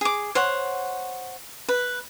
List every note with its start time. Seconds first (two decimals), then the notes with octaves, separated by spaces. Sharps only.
0.01 G#4 D6
0.35 C5 C#5 F#5
1.69 B4